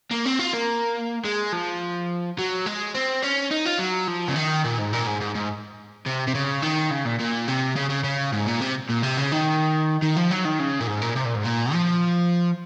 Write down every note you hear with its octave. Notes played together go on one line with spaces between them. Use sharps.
A#3
C4
F4
A#3
G#3
F3
F#3
G#3
C4
C#4
D#4
F4
F#3
F3
C#3
D#3
A#2
G#2
A#2
G#2
G#2
G#2
C3
C3
C#3
D#3
C#3
A#2
A#2
C3
C#3
C#3
C#3
G#2
A#2
C3
A#2
C3
C#3
D#3
D#3
F3
F#3
D#3
C#3
A#2
G#2
A#2
C3
A#2
G#2
A#2
F3